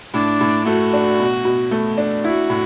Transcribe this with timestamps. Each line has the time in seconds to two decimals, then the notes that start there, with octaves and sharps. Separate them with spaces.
0.14 A2 D4
0.41 A2
0.66 A3 F#4
0.93 D4
1.20 B2
1.45 B2
1.71 A3
1.98 D4
2.24 E4 F#4
2.50 A2